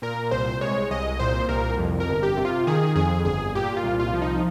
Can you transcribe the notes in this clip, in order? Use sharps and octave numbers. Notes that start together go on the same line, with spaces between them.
A#2 A#4
C2 C5
G#3 C#5
C2 D#5
A#2 C5
C2 A#4
F2
A#4
G1
G4
C3
F4
D#3 G#4
F2 G#4
G1 G#4
A#2 G4
F4
C2
F4
F3
D#4